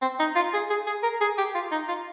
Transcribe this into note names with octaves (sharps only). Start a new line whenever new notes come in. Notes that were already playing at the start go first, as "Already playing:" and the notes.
C4
D#4
F4
G#4
G#4
G#4
A#4
G#4
G4
F4
D#4
F4